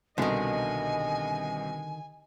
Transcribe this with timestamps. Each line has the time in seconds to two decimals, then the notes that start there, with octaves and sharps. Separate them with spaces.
0.18 C2 B2 D3 D#3 D#5 G#5